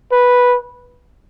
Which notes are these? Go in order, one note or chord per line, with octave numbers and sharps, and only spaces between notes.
B4